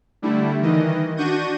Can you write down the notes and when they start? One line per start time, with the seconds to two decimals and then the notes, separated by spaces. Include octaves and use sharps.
0.22 D3 G3 A3 E4
0.62 D#3 E3 D#5
1.17 D4 F#4 C#6 G6 A#6 D#7